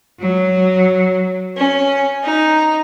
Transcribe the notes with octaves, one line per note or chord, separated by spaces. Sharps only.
F#3
C#4
D#4